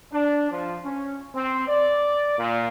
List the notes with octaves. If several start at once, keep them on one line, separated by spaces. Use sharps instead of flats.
D4
F3
C#4
C4
D5
A#2